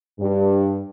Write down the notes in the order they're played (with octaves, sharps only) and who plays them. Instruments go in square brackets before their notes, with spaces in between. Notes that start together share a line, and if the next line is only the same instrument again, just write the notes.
[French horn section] G2